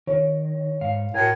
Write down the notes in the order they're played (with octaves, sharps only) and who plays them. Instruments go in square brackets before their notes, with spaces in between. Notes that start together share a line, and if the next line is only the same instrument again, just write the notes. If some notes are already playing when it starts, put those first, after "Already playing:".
[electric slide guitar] D#3 [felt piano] C#5
[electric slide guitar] G#2 F5
[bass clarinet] A2 [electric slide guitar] F#4 A#4 [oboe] G#5